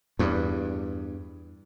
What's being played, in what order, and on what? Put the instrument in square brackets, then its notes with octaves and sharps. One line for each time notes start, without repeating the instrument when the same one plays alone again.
[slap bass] E2 G2